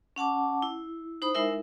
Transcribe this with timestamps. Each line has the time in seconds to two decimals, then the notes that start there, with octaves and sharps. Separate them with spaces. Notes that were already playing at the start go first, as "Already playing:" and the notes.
0.16 C#4 F#5 A5 D6
0.62 E4
1.22 D#4 C5 B5 D#6
1.35 G#3 D#4 E4 A#4 E5